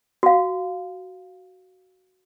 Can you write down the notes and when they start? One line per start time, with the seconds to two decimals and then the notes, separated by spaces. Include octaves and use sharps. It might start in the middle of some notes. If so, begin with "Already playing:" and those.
0.23 F#4 F5